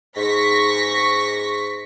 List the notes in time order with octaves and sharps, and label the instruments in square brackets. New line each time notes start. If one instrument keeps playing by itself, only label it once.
[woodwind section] G#2 [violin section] C#6 A#6 B6